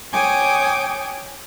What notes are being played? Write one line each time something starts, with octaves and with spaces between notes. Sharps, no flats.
C#5 G5 G#5 D6 D#6